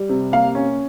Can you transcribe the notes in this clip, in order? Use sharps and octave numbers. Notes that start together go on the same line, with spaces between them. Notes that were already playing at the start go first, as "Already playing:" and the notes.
Already playing: G3
C3
A#3 F5
C#4